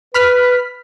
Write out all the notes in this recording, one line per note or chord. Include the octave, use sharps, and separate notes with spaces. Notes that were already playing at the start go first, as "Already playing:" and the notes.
B4 B5 F6 B6